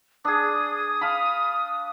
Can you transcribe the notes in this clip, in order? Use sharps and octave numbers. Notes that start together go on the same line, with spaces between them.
D4 G#4 D#6
F5 A5 B5